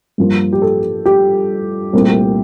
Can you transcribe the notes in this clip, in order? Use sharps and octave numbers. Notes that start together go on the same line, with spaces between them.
G2 F3 A#3
G4
A4
G4
C2 A#2 A3 C4